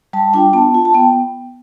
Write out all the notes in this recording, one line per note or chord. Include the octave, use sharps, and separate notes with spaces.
G3 A5
D4 F4 G5
B3 A5
F4
A5
B3 G5